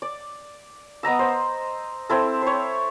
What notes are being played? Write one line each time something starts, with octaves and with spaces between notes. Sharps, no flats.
D5
B3 D#5 A#5 E6
C5
C4 E4 A4
C5 C#5